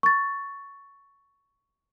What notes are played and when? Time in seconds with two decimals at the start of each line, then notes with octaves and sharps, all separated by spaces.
0.03 C#6 A6